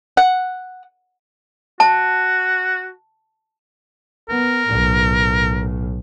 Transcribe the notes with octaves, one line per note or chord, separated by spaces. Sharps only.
F#5
F#4 A5
B3 A#4
B1 A2